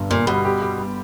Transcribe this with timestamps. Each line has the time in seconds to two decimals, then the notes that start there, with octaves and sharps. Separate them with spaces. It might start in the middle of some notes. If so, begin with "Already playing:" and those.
Already playing: G1 G2
0.10 G1 A#2
0.27 B2 G3
0.45 G4
0.62 G4
0.78 G3